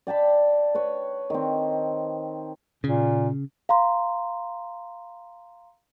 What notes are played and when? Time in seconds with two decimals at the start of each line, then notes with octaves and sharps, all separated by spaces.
0.07 D5 G5 A5 B5
0.75 B4 C#5
1.30 D#3 C4
2.84 A#2 C#3
3.69 F5 A#5 C6